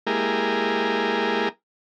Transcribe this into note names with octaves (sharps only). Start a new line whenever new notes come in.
G#3 A#3 E4 G4 G#4 A#4